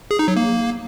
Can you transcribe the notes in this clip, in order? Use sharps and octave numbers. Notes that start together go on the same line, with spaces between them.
G#4
D#4
F#3
A#3